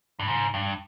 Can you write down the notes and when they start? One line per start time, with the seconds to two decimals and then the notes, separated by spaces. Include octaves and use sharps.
0.19 G2
0.27 G#2
0.54 G2